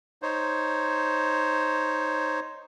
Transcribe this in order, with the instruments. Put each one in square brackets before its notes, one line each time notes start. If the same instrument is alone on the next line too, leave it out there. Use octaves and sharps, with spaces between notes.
[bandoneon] D#4 C5 C#5